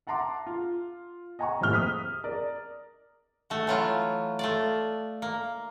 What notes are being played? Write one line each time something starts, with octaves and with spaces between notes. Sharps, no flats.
E5 F#5 A5 A#5 C6 D6
F4
D#5 F#5 G#5 A#5 C#6
D#1 F2 A2 A#3 F6 G7
D#6 F6 B6
A#4 D5
A3 F#4
E3 F#3 F4
A3 F4 D5
A#3